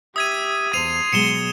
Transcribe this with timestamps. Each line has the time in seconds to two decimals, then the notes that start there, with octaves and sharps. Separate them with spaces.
0.16 G4 E5 D#6 G#6 D#7
0.73 E2 C5 C6 C7 D#7 F7
1.13 B2 F#3 G#3 C#7 E7 G7